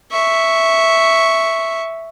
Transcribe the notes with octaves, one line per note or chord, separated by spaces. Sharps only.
E5 C#6